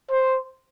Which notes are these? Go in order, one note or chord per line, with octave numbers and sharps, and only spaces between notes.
C5